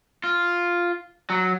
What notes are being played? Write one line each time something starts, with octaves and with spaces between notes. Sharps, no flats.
F4
F#3